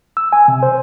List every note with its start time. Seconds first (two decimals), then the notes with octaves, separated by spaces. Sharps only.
0.17 E6
0.32 G#5
0.48 C3
0.63 C5